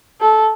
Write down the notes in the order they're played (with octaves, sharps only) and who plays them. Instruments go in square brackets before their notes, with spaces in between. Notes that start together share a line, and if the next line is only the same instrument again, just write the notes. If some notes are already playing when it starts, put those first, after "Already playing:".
[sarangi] A4